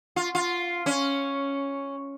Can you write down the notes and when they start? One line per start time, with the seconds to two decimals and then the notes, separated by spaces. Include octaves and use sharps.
0.16 F4
0.35 F4
0.86 C#4